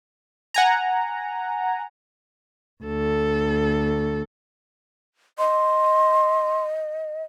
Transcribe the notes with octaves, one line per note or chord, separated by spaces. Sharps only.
F#5 G#5 A#5
D2 A4
D#5 C6